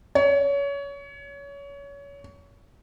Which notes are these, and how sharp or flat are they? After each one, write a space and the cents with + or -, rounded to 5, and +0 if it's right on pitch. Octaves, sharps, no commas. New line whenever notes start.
C#5 +25